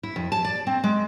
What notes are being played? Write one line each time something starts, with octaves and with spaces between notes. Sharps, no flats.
E4
F2
A5
D5
C4
G#3